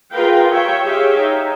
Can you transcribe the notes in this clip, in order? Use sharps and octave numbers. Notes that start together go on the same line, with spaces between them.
F4 G#4 A#4 B4 F5 G5
G4 C#5 E5 G5
G4 G#4 C#5 E5 F5 G5
D#4